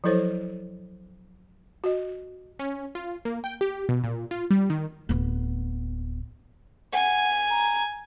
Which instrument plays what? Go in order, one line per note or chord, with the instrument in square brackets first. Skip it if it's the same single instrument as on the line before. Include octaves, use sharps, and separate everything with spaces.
[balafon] F3 F#3 E4 A4 C5 C#5
F#4 D#5
[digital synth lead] C#4
F4
A#3
G5
G4
B2
A#2
F4
G3
D#3
[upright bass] D1 B3
[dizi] F#5 [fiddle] G#5
[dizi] A#5